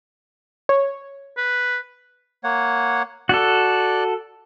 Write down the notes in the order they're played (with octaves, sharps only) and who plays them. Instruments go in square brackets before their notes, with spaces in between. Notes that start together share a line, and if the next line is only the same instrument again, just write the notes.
[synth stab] C#5
[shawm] B4
[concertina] A#3 C#5 F#5
[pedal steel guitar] F#4 A4 [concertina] D5 F#6